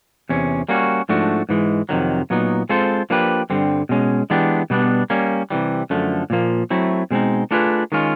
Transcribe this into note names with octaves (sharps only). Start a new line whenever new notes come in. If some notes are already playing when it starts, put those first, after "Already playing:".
E2 C3 C#4
G3 A#3 C#4 F#4
G#2 F3 A3 D4 F#4
G#2 E3 G#3
F2 C3 D#3 F#3
A#2 F#3 B3 D#4
G#3 C4 F4 A4 C5
F3 A#3 D4 G4 B4
G2 D3 G3 C4
B2 G#3 C#4
E3 G#3 B3 D4 G4
B2 G3 B3 D4
G3 A#3 C#4
C3 E3 G3
F#2 D3 F3 A3
A#2 F3 A#3
F#3 A3 C4 E4
B2 G#3 C4 D#4
A3 D4 F4 G#4 B4
D#3 G#3 C#4 F4